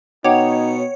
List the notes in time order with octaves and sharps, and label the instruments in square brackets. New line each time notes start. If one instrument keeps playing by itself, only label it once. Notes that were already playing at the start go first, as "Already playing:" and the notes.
[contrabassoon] B2 [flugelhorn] D#4 [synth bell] C#5 [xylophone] F#5 G5 D6